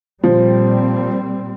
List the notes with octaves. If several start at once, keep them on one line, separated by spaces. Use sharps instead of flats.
A#2 F3 G3 C4